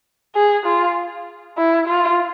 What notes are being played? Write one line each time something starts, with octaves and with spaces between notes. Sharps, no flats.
G#4
F4
E4
F4